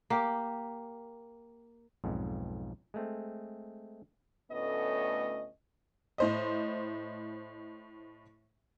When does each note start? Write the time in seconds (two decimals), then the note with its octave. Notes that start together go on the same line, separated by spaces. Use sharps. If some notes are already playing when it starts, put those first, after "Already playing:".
0.10 A#3 G4
2.04 B1 F2 G#2
2.94 G#3 A3 C4
4.51 D2 A2 A3 B3 C#4 D#5
6.18 A2 C5 D#5